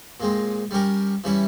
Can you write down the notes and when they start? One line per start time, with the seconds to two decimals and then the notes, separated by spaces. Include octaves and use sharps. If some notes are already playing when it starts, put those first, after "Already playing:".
0.20 A#2 G#3 C4
0.71 G3 C#4 G4 A#4
1.24 E3 G3 C#4 E4